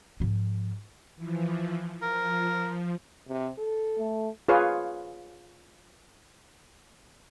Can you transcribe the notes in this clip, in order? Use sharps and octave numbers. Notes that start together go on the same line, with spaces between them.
G#2 F3
E3 F3
F3 A#4
C3
A4
A3
F4 G#4 B4 C#5 F5